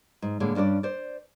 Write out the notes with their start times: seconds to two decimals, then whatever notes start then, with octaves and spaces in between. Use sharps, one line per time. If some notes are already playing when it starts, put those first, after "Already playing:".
0.22 G#2
0.40 A2 D3 G#3 A#3
0.55 G2 C#4 D4 A#4 D5
0.83 C5 D5